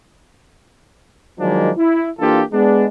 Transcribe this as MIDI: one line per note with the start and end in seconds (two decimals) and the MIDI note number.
1.38 1.70 51
1.38 1.70 53
1.38 1.70 54
1.38 1.70 56
1.38 1.70 58
1.38 1.70 62
1.77 2.07 64
2.19 2.42 52
2.19 2.42 58
2.19 2.42 62
2.19 2.42 65
2.19 2.42 67
2.19 2.42 69
2.52 2.85 56
2.52 2.85 59
2.52 2.85 62